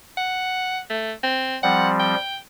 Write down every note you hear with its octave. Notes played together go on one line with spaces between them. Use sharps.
F#5
A3
C4
F3 G3 C4 F#5
G5